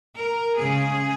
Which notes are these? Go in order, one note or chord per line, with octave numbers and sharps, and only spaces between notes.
A#4
C#3 G#3 C#4 G#4